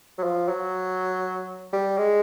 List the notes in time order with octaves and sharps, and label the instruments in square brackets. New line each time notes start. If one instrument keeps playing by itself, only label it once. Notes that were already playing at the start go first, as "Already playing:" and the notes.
[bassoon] F#3
F3
F#3
G3
G#3